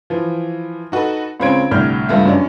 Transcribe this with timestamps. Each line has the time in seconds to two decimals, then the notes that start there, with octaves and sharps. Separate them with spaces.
0.10 E3 F3
0.92 D#4 F#4 A4 B4
1.40 C#2 C#3 C4 C#4 G#6 D7
1.71 C2 A2 D3 F6 G6
2.09 C#2 G2 A3 B3 E5
2.25 F#2 C#4 D4